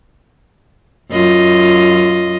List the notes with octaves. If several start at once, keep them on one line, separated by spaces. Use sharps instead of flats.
F#2 F4 D#5